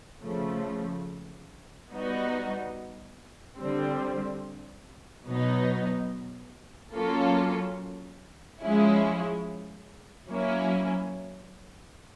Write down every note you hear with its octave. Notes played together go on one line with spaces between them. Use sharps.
C#3 F3 A3
G3 B3 D#4 F#4
D3 G3 C4
B2 F#3 B3 D#4
F#3 A#3 C#4 F4 A4
F3 G#3 C#4 E4
F#3 A#3 C#4 E4